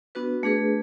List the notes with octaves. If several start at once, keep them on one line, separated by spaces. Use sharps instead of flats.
B3 D4 F#4 B4
A3 D4 G#4 B4